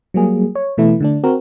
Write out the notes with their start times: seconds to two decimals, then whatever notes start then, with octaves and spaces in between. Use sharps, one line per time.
0.14 F#3 G3 A#3 G#4
0.56 C#5
0.77 B2 E3 A3 E4
1.01 D3 A3 D4
1.24 C4 F#4 A#4